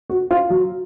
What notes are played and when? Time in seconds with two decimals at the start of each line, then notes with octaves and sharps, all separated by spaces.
0.10 F#4
0.31 F4
0.50 F#3